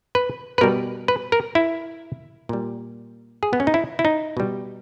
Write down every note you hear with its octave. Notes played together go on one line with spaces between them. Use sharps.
B4
B4
B2 G3 A#4
B4
A#4
E4
A#2 G3
G#4
B3
C#4
D#4
E4
E4
D#4
B2 G3